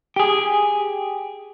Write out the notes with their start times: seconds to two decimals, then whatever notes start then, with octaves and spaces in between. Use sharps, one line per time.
0.16 G4 G#4